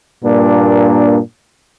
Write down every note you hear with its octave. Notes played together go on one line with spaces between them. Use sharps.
G2 A#2 A#3 D4